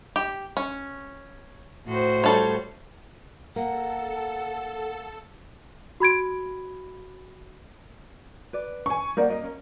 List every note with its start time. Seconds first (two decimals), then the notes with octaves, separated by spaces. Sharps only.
0.16 G4
0.57 C#4
1.86 A2 F#4 C5
2.24 G3 A4 C#5
3.56 A#3 A4 F#5
6.00 F#4 B5 G#6 D7
8.53 B4 D5
8.86 G#5 C#6
9.17 A#3 A#4 C5 D5 F#5
9.30 C#4 D4 D#5
9.44 C#4